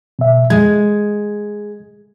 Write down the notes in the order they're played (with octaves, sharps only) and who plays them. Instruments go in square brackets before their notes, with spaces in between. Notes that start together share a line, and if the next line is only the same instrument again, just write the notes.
[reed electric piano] B2 E5
[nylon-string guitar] G#3 [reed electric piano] G#6